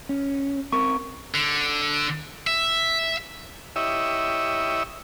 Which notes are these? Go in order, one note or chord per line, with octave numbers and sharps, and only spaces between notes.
C#4
C4 A#4 C#6
D3
E5
E4 G4 C#5 D#5 E5